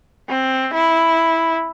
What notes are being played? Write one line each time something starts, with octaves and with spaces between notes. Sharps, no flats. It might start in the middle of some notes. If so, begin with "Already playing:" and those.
C4
E4